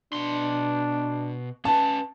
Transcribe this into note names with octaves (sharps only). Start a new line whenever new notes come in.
B2 D4 C6
C#4 B4 A5